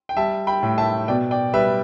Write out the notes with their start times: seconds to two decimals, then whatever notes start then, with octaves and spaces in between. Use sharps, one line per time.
0.09 G5
0.17 G3 E5 A5
0.47 G5 B5
0.63 A2
0.78 E5 A5
1.08 B2 D5 G5
1.31 D5 G5
1.54 G3 B4 E5